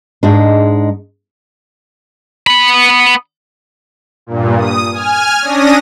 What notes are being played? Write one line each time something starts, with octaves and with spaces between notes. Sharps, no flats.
G#2 G#3 D4
B3 B5
G2 A#2
D#6
G#5 F6
C#4 D4 D#6 A#6